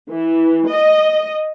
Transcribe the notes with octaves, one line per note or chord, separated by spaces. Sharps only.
E3
D#5